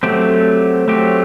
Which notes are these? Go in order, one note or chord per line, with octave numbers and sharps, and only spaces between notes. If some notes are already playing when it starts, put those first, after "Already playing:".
F#3 A3 C4 G4
F#3 A3 C4 G4